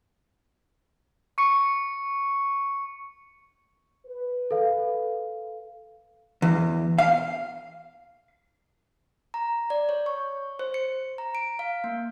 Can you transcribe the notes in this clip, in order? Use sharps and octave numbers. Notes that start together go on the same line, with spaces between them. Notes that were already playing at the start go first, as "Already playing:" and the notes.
C#6 C#7
B4
A4 F5
E2
F5
A#5
D5
C#5
C#6
C5
C#7
A#5
D7
F5
A#3